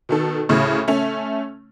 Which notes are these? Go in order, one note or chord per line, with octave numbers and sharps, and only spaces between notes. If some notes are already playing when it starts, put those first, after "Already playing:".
B2 D#3 A4
D2 A2 C#3
A3 C#4